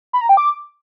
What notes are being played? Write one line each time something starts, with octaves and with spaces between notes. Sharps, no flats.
B5
A#5
G5
D6